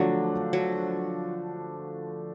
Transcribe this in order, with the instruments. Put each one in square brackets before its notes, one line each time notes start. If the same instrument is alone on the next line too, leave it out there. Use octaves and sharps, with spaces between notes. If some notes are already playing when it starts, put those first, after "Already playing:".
Already playing: [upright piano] D3 F3 A3 D4 F#4 [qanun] F#3
[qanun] F#3